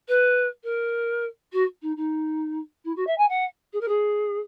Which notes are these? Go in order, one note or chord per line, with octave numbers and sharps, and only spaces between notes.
B4
A#4
F#4
D#4
D#4
E4
F#4
E5
G#5
F#5
G#4
A#4
G#4